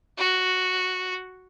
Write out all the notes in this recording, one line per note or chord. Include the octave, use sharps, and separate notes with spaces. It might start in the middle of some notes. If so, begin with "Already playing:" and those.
F#4